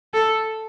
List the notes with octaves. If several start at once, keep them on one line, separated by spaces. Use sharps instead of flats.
A4